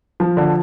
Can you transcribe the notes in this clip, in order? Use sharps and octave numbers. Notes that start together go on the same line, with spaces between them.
F3
D3